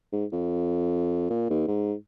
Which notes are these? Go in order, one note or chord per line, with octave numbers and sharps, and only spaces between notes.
G#2
F2
A#2
D#2
G#2